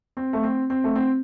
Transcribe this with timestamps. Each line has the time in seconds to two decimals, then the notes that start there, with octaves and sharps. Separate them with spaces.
0.17 C4
0.33 A3
0.43 C4
0.70 C4
0.84 A3
0.96 C4